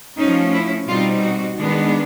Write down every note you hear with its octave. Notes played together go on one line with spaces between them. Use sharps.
F3 A3 C#4 D#4
E4
B2 G3 C4 D#4 F4
F#4
D#3 G#3 B3 D4